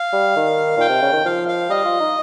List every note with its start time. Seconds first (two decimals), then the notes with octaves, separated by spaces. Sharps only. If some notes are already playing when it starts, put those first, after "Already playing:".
Already playing: F5
0.13 G3
0.36 D#3
0.77 A#2 G5
0.89 C3
1.02 C#3
1.13 D#3
1.25 F3 F5
1.48 F5
1.70 G3 D#5
1.85 F4
2.00 D#4